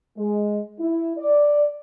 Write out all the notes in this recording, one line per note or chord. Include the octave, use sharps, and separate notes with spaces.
G#3
E4
D5